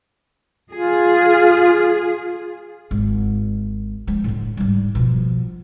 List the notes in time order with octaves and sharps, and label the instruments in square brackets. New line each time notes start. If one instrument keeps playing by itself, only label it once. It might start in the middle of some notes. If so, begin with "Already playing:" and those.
[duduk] F4 [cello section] G#4
[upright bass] G#1
F3 G#3
A2 D3
G#2 G3
B2 F3